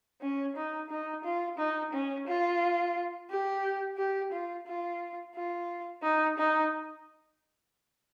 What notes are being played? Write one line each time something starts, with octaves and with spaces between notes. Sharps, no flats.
C#4
D#4
D#4
F4
D#4
C#4
F4
G4
G4
F4
F4
F4
D#4
D#4